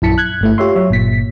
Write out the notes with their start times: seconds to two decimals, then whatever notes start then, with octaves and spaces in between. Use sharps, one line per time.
0.02 A#1 F#2 E4 A5 B6 C#7
0.18 F#6 G#6
0.41 G1 A3 E4
0.58 F4 G4 C#5 E5 C6
0.76 F#3 C#5 E5
0.90 G1 A#2 B6